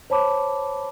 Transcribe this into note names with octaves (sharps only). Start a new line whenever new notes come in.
C5 C#5 A5 B5 D6